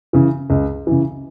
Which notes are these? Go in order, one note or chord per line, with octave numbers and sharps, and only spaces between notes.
C#3 E3
C#2
C#3 E3